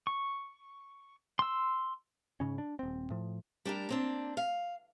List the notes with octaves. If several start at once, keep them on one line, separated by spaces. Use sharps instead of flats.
C#6
C6 E6
G#2 C#3 C#4
D4
D#1 C4
A2 F3
G3 D4 G4 A#4
A#3 C4 D4
F5